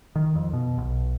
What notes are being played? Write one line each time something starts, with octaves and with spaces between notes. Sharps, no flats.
D#3
F2
B2
B1